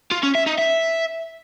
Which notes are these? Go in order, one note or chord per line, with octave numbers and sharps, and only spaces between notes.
F4
C#4
E5
D#4
E5